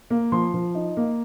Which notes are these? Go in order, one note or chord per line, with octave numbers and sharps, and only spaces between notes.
A#3
F3 C6
F3
D#4
A#3